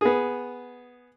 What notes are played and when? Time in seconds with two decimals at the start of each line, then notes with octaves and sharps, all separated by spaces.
0.01 B3 G#4